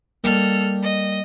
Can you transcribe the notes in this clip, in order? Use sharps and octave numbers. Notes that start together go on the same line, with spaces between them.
G3 A#3 D#4 A4 F6
D#5